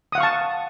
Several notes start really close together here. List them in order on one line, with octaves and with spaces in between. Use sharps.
D#6 F#5 F5 C#6 A5